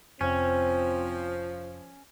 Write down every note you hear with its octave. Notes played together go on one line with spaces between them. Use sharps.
F1 F3 C4 C#4